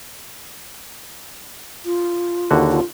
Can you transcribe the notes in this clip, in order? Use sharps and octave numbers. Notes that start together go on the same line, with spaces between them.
F4
D#2 D3 F#4
F4